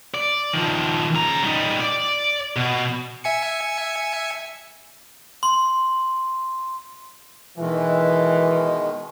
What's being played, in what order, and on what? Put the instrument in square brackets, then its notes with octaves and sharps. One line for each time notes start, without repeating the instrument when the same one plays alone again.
[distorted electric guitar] D5
D#3 F3
C#3 A#5
G3 D#4
D5
B2
[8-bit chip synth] E5 G#5 C#7
[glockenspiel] C6
[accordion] B2 D#3 G#3 [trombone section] E3